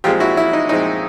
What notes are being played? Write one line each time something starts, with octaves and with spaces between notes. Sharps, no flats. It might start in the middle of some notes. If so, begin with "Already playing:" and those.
A#2 F3 G#3 C4 F4 G4
E4 F#4
E4
D#4
A#2 F3 G#3 C4 D#4